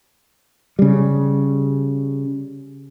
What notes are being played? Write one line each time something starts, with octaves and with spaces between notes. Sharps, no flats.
C#3 G3